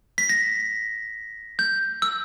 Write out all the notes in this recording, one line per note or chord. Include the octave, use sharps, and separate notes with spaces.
B6
A#6
G6
E6